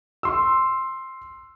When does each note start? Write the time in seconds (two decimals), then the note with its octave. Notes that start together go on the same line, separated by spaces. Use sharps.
0.23 C6 E6